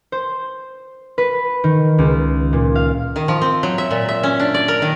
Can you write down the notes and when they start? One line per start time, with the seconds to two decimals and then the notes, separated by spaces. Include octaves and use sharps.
0.12 C5
1.18 B4
1.64 D#3
1.98 C#2
2.53 A#2
2.75 F5
3.16 D#3
3.28 F3
3.41 C4
3.63 F#3
3.78 E5
3.91 A#2
4.08 E5
4.23 C#4
4.39 D4
4.54 D5
4.68 A#4
4.82 D#3